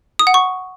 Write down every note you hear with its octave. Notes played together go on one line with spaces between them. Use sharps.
D#6
F#5
C#6